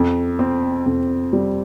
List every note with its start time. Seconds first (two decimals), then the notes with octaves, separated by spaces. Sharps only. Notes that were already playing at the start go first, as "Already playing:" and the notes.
Already playing: F2
0.39 C4
0.86 F2
1.33 G3